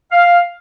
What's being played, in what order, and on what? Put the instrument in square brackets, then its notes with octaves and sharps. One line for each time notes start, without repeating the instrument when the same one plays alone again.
[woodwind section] F5